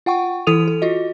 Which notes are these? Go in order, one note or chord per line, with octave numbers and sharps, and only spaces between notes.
F4 F#5 G5 C#6
E3 E4 A4 D#6 D#7 F7
A4
F4 F#4 D#5